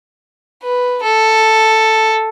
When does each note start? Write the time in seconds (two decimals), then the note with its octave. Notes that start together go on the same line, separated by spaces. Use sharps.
0.63 B4
1.03 A4